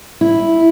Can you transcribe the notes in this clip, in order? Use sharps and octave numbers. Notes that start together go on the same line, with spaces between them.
E4